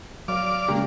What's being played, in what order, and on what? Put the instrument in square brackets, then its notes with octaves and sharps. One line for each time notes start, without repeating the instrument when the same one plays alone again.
[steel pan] F#3 [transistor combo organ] D5 F5 D6
[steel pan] C#3 G#3 G4 [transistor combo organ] A#3 D4